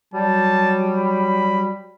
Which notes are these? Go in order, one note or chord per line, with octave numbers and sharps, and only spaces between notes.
F#3 G3 A5
B5